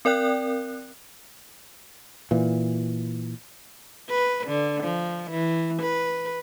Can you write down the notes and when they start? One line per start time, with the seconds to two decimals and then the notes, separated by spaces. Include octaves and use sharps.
0.05 C4 A#4 D5 G5 F#6
2.31 A#2 E3
4.10 B4
4.47 D3
4.84 F3
5.31 E3
5.82 B4